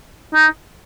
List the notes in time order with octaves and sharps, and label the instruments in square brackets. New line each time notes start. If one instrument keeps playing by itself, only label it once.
[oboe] D#4